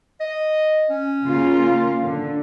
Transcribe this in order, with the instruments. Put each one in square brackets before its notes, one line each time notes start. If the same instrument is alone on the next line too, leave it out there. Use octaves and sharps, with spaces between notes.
[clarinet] D#5
C#4
[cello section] C#3 A#3 F4
D3